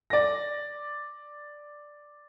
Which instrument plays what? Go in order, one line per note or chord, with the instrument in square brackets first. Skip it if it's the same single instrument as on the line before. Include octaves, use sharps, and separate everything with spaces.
[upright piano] D5 A#6